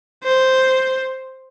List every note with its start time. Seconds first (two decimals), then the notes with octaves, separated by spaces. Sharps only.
0.24 C5